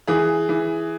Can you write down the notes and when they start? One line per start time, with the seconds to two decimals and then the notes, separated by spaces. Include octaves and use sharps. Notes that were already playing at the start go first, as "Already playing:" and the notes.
0.07 E3 G#4
0.49 E3